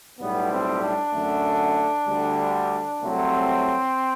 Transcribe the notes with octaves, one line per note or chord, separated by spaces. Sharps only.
B1 A2 G3 B3
C4
D4
F#2 D3 A3
D2 D3 G3
C2 C3 F#3 A3 C4